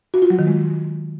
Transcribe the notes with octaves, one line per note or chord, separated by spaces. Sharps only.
F#4
F4
F#3
D#3
G#3